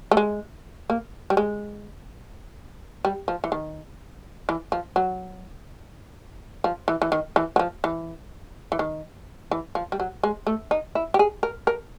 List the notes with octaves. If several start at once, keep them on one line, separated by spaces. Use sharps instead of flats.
A3
G#3
A#3
G3
G#3
G3
F3
E3
D#3
E3
F3
F#3
F3
E3
E3
D#3
E3
F#3
F3
E3
E3
D#3
E3
F3
G3
F#3
G#3
A3
D#4
E4
G4
G#4
A#4
A#4